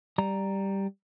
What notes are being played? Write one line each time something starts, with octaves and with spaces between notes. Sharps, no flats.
G3 A#5